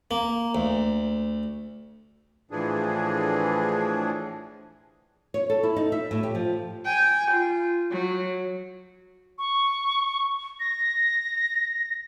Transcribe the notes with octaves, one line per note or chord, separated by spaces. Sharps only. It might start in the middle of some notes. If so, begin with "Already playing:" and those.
A#3
D2
A2 E3 F3 D4 G#4
C#5
A4
E4
D#4
E5
A2
G4
F3
G5 G#5
F4
F#3
C#6
A#6